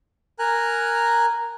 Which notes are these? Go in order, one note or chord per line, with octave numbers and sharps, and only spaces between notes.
A#4 G#5 A#5 F#6